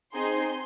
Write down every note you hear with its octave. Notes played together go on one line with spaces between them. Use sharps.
C4 D#4 G#4 C6